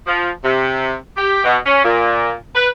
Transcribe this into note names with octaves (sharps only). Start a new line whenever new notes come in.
F3
C3
G4
B2
C#4
A#2
B4